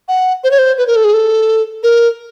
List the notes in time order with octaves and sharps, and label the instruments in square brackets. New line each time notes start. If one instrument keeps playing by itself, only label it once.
[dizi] F#5
C5
C#5
C5
B4
A#4
A4
G#4
A4
A#4